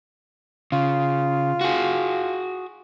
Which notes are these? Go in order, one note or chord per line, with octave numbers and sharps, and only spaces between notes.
C#3 F4
F#4 G#4